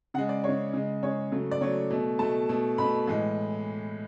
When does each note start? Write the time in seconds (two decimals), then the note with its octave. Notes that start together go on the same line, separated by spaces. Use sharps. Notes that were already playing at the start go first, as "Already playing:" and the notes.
0.14 C#3 F#5
0.18 G#3
0.29 D5
0.44 C#3 G#3 C#5
0.73 C#3 G#3
1.03 C#3 G#3 C#5
1.32 C#3 F#3 A3
1.51 D5
1.61 C#3 F#3 A3 C#5
1.90 B2 A3
2.19 B2 A3 A5
2.49 B2 A3
2.78 B2 A3 B5
3.08 A2 E3 G#3